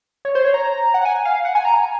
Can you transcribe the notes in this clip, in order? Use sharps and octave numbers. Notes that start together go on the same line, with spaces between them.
C#5
C5
C#5
A#5
F#5
G#5
F5
F#5
G#5
A#5
G#5